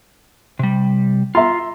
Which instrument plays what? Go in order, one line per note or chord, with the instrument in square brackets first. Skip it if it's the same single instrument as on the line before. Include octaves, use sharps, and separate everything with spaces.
[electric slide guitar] C3 G3
[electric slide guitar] F4 [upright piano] E5 A#5 C6